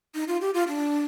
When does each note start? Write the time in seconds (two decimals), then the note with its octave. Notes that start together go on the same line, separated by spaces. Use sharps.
0.15 D#4
0.28 F4
0.41 G4
0.54 F4
0.68 D4